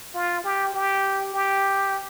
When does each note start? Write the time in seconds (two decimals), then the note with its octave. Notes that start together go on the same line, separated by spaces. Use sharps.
0.14 F4
0.44 G4
0.73 G4
1.34 G4